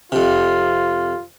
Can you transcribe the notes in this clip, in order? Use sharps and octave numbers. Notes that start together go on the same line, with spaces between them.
F2 C3 F4